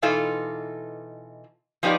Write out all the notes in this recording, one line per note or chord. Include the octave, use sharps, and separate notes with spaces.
B2 E3 D#4 F4 A4
F3 B3 D#4 G4 D5